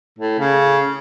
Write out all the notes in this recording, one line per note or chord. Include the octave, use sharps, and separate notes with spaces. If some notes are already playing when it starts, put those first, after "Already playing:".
A2
C#3